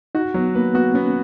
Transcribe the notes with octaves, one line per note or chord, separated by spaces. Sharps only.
D#4 F#4
F#3 B3
A#3 B4
B3 F#4
B3 C#4